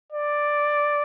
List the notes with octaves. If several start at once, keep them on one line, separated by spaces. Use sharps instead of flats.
D5